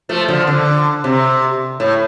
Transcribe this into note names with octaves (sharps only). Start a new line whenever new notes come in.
F3 A3
D3 F3
D3
C3
A2